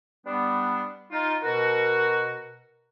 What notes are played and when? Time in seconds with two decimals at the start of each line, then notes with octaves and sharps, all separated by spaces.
0.26 G3 B3 D4
1.12 D#4 F4
1.43 B2 F#4 A#4